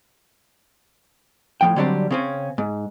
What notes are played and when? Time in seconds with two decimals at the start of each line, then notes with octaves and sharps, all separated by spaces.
1.61 A2 F3 G5
1.76 D3 F#3 G3 C4 D4
2.11 C#3 C4 C#4
2.58 G#2